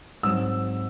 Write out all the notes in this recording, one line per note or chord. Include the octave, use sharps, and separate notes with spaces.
G#2 F#3 C4 E6